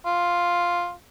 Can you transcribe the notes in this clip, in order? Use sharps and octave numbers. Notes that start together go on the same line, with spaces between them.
F4